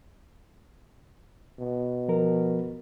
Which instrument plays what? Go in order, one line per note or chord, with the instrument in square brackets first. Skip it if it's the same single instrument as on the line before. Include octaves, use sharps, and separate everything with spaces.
[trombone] B2
[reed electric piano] F3 A#4